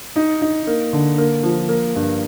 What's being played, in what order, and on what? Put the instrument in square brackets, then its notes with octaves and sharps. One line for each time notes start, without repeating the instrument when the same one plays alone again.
[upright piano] D#4
D#4
A#3
D3
A#3
F3
A#3
G2